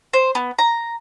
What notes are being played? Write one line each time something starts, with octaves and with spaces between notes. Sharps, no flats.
C5
B3
A#5